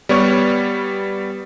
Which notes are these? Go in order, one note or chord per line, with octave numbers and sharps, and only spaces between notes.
G3 B3 C#5 F6